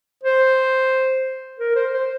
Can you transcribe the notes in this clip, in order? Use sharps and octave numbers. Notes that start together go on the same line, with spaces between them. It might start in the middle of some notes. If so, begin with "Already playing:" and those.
C5
A#4
C5
C5